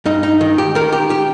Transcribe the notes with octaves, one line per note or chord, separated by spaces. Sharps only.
G2 D#4
D#4
D#3
G4
D#3 A#4
G4
G4